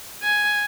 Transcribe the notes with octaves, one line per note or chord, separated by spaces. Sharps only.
G#5